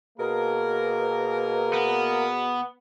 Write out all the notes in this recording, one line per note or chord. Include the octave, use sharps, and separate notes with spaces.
B2 A#3 G#4 A#4
B3